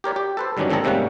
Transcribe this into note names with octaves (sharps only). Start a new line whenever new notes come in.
G4 A#4 C#5 D5
G4
A4 B4 C5
G2 D3 D#3 F#3 C#4 D4
G#2 D#3 C4 G#4 A4 A#5
G#2 C3 G3 A#3 C#4 F#5